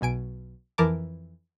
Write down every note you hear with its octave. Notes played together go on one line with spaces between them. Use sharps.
B1 B2 G#5 D7
F2 E3 A#4 A5 D6